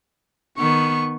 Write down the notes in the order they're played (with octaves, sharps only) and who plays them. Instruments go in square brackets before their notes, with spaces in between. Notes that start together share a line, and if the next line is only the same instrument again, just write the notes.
[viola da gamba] D#3 B3 [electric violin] C#6